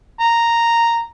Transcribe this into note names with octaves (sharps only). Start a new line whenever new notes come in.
A#5